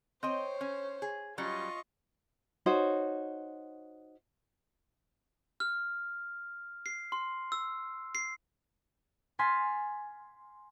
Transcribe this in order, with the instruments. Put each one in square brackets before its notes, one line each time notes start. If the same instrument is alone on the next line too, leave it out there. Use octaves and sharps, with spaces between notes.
[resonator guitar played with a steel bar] C4 D#5 G5 [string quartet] C5 C#5
[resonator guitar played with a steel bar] C#4
G#4
[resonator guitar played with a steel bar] F#3 G3 C#4 [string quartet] F4 D#5 C#6
[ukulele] D#4 F#4 C5 C#5
[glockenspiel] F6
C7
C6
E6
C7
[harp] G#5 C6 F6 A6 B6